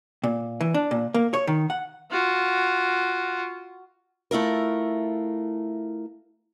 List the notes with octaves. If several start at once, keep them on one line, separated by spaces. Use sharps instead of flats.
A#2
E3
D4
A#2
A#3
C#5
D#3
F#5
F4 F#4
A3 E4 F4 A#4